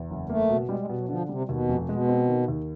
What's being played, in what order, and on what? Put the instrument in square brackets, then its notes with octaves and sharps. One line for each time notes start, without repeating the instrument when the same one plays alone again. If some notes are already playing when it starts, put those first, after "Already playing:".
Already playing: [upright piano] E2
F#1
[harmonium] A3 [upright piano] A#3
[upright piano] B2
[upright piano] G3 [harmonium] G#3
[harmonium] G#3
[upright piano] B2
[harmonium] F#3
[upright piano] D3 [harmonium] F3
[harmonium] C3 [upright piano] G3
[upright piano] D#2 [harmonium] B2
[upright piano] F1
[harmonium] B2 [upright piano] G#3
[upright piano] C4
D#3
D#2